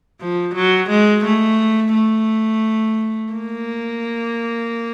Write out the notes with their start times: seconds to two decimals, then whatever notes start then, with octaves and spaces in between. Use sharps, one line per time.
0.21 F3
0.55 F#3
0.90 G#3
1.25 A3
1.94 A3
3.33 A#3